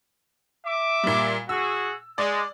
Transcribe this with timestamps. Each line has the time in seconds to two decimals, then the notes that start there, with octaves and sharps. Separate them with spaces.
0.66 E5 D6
1.03 A#2 G3
1.49 F#4 G#4 E6
2.18 G#3 D5